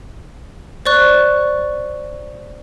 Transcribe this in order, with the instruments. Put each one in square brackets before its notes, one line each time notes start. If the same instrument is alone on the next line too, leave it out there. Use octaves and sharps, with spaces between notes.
[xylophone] C5 D5 C#6 F#6